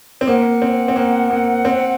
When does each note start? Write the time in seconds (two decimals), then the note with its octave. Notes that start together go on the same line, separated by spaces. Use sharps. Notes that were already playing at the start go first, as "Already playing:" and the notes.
0.21 C4
0.27 A#3 F#5
0.62 C4
0.88 C4
0.96 A#3
1.30 A#3
1.65 C4